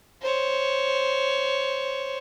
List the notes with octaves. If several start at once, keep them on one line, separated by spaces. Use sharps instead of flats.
C5 C#5